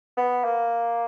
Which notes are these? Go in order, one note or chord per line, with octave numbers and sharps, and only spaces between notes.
B3
A#3